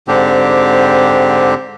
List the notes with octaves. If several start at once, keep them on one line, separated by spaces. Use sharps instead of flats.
G#2 D3 C4 D4 G4